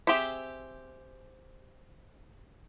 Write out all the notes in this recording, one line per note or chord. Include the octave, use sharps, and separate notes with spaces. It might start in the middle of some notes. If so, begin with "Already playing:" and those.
C4 G4 G#4 C5 E5